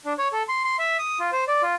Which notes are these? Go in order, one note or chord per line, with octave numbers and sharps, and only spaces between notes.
D4
C#5
A4
C6
C6
E5
D#6
F4
C5
D5
F4